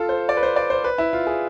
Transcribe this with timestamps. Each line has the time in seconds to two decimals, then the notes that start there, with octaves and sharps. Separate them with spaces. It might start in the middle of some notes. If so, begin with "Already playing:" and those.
Already playing: F4 A4
0.09 C5
0.29 D5
0.37 B4
0.43 C5
0.56 D5
0.70 C5
0.84 B4
0.98 E4
1.13 F4
1.27 G#4